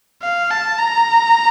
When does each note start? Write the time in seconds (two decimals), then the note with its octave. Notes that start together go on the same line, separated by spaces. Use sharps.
0.22 F5
0.51 A5
0.79 A#5